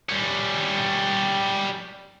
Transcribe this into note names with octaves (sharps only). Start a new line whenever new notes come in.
G3 C#4